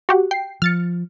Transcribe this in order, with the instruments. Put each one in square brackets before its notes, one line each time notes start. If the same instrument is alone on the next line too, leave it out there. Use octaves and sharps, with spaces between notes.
[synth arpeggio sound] F#4 G4 F#5
G5 C7
[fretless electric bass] F3 [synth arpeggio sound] F6 A6 C#7